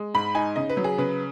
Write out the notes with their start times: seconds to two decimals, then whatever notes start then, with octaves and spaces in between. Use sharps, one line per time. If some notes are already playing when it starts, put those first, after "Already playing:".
Already playing: G#3
0.14 G#2 B5
0.35 D#4 G#5
0.56 C#3 D#5
0.69 B4
0.77 F#3
0.84 G#4
0.98 C#3 B4